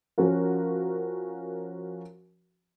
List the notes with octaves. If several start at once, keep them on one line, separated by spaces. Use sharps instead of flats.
F3 C#4 F#4 A#4